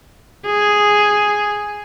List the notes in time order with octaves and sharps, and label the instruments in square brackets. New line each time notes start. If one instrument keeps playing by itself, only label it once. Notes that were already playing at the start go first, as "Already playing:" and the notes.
[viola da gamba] G#4